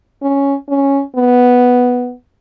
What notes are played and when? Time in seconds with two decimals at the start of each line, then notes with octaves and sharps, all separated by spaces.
0.22 C#4
0.69 C#4
1.16 B3